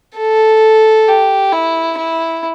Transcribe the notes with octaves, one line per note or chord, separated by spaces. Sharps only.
A4
G4
E4
E4